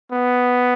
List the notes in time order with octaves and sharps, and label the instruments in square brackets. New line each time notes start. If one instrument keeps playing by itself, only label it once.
[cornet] B3